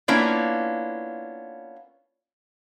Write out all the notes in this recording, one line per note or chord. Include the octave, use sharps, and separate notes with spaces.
A#3 B3 C#4 D4 E4 F4